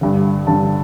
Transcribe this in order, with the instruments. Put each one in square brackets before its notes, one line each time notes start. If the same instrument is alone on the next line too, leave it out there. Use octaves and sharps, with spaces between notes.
[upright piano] G2 D3
G2 D3 A5